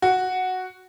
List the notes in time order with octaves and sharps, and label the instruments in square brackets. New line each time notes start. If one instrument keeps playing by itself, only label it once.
[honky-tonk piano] F#4